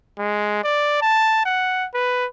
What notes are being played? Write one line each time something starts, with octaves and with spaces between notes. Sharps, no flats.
G#3
D5
A5
F#5
B4